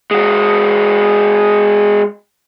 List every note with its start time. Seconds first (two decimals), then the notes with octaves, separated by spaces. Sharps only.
0.11 G#3 F#4